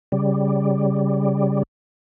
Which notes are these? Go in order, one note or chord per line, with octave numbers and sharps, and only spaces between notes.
C#3 G3